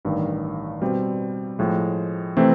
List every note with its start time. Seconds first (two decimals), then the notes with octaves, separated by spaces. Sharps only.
0.05 A1 G2 D#3
0.82 B2 G3 C4
1.59 A2 F3 G#3
2.37 C3 E3 A3 C4